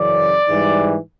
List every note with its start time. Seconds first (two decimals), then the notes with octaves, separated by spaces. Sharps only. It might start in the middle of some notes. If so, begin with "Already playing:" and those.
Already playing: F#2 C#3 E3 D5
0.48 G#2 E3 G3